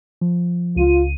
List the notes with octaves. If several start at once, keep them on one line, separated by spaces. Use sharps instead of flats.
F3
C#2 F4 D#7